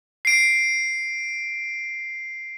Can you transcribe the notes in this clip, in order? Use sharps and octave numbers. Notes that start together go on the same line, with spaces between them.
C7 D7